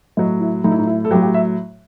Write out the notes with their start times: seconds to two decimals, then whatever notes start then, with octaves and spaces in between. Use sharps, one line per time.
0.17 A2 F#3 D#5
0.41 E4
0.64 A2 F#3 D#4
0.72 E4
0.79 D#4
0.87 E4
1.05 A4
1.11 F#3 G4
1.15 A2
1.22 G4
1.34 E5